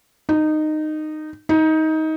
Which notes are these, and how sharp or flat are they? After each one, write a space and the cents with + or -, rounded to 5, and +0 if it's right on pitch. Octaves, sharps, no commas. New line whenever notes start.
D#4 -15
D#4 +20